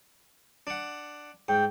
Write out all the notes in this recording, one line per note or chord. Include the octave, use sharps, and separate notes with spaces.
D4 F#5
G#2 G5